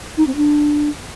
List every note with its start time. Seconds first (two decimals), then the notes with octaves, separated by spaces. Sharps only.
0.17 D#4
0.27 C4
0.36 D4